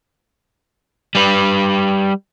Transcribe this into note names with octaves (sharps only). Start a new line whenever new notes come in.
G3 B4